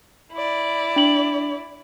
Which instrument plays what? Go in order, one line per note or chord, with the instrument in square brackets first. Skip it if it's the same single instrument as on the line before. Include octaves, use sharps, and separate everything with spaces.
[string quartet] E4 D5
[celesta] D4 F#7